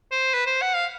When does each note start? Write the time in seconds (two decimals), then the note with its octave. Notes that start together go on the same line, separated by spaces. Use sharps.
0.12 C5
0.34 B4
0.47 C5
0.62 F#5
0.75 F5